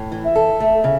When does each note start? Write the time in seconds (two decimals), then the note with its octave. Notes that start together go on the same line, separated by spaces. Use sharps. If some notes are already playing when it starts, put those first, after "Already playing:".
Already playing: A2
0.12 E3
0.24 E5
0.35 A4
0.60 A3
0.84 C#3